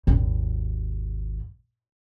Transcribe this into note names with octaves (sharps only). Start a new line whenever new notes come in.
G#1 D#2